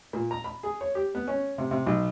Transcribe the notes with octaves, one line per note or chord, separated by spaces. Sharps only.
A#2
A#5
B5
G#4
C#5
G4
B3
C#4
C3
C3
B1